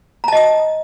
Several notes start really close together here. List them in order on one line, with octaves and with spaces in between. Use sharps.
A#5 A5 D#5 D#6